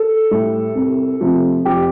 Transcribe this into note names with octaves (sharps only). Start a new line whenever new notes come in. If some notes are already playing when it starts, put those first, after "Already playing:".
Already playing: A4
A2 G3
C2
C3 F3 A3
F2 G4